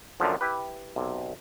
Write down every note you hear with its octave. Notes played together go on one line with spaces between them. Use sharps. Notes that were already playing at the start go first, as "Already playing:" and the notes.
F#2 A#2 D3 F3
E4 G4 B4
B1 C3